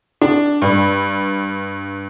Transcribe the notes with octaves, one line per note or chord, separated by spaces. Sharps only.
D4
G2